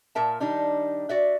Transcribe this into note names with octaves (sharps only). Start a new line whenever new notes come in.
A#2 A#4 E5 A5
D#3 G3 D4 D#4
F#4 D5 E5